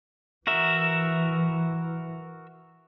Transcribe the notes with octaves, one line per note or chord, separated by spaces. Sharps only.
E3 F#4 A#4 E5